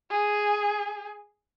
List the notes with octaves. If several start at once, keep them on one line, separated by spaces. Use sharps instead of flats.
G#4